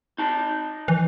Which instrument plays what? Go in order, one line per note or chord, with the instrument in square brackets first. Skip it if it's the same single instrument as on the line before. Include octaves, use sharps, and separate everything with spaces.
[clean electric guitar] D#4 A5
[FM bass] E3